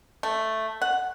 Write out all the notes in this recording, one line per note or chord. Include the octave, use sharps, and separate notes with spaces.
A3
F#5